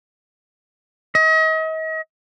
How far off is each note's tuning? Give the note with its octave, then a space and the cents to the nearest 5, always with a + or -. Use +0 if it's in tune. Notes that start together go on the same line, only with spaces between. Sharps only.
D#5 +40